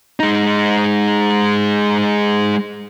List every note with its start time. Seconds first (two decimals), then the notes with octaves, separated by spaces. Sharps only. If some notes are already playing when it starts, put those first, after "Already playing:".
0.20 G#3 D#4